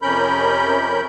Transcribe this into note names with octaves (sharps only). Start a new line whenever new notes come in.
F2 C3 C#4 A#4 B5 G6